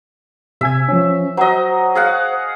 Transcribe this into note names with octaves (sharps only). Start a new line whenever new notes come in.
C3 E5 G#5 G#6
F3 C#4
F#3 C5 D#5
G#4 F5 F#5